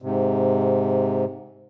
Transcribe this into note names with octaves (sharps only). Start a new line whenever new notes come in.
G#2 C3